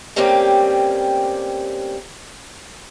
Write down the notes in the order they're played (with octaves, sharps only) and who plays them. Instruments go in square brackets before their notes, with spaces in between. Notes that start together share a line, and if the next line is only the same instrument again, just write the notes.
[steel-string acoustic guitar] G3 A3 A#3 C4 C#4 G4